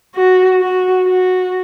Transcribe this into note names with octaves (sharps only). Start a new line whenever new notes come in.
F#4
F#4
F#4